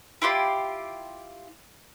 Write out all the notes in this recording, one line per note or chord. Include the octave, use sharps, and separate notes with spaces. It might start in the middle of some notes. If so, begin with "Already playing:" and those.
E4 F4 G4 C6